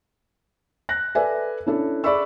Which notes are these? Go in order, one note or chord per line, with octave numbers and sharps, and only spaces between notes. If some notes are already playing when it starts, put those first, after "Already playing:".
F#6 A#6
A4 B4 D5 E5 G#5
C#4 D4 E4 A4
G#4 D5 E5 B5 C#6 E6